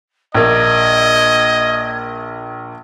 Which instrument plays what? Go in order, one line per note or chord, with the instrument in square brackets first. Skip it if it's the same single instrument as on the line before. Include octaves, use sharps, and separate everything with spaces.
[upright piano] A#1 A#3 [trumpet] D#5 [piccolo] G#6